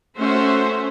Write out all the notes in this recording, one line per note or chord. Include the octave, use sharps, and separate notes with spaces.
A3 C#4 F#4 C5 E5